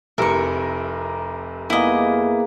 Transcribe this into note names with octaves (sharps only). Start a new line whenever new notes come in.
F1 C3 E4 A#4 C#6
A#3 B3 E4 G#4 D#5